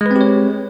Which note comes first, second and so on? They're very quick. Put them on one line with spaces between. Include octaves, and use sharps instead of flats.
G#3 B4 C4 G4 C#5